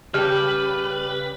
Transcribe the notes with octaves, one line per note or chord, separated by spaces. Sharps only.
C#3 G3 G4 B4 F6